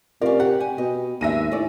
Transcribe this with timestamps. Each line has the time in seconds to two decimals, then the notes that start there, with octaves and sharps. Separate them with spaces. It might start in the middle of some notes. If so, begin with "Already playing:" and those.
0.21 C3 C#4 F4 A#4 D5
0.40 G4 F#5
0.60 G#5
0.78 B2 D#5
1.21 D#2 G#2 D4 E5 A#6 D#7
1.52 A2 C#4 D5